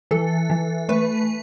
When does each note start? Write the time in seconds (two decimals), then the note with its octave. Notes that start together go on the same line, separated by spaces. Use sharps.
0.11 E3 A4
0.50 E3
0.89 A3 B4